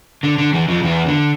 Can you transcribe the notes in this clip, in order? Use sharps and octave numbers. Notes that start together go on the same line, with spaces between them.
D3
D3
E2 E3
F2 F3
E2 E3
D3